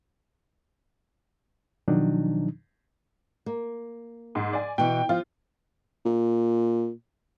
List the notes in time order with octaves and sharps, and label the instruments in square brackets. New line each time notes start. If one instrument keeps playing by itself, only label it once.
[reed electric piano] B2 D#3 F3 F#3 D4 D#4
[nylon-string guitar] A#3
[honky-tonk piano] G#2
D5 G#5
[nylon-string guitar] B2 E3 [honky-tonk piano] G5
[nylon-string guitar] F3 [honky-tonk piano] F4
[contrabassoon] A#2